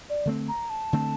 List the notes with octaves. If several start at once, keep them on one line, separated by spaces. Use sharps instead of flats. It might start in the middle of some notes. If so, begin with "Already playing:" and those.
D5
D3 A3 C4
A#5
A5
D3 A3 C4